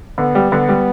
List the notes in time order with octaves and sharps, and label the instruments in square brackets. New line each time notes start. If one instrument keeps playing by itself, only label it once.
[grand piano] D3 [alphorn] B3
[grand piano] G3
[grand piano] D3 [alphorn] B3
[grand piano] G3